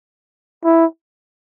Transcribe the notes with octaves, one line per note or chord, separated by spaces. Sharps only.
E4